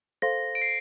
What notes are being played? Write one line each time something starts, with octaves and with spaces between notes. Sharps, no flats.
A4 C5 F5 C6 A#6
D7
C7